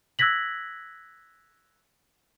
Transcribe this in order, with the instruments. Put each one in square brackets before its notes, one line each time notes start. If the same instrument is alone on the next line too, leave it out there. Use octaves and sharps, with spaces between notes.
[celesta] E6 F#6 G#6 A#6 B6 F#7